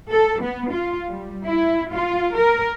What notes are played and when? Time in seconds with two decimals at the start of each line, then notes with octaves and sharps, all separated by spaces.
0.11 A4
0.42 B3
0.72 F4
1.09 G3
1.45 E4
1.92 F4
2.37 A#4